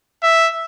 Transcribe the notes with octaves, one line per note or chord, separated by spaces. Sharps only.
E5